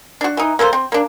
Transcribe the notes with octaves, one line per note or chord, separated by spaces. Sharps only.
D4 F#4
E3 D#4
A#3 A4 B4 C5
C4
A#3 D4